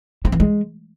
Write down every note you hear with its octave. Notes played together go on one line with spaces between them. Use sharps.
C4
E3
G#3